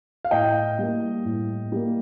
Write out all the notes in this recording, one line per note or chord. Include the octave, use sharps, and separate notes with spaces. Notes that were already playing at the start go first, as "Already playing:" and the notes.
F5
A2 D#5 G5
G3 A#3
A2
G3 A#3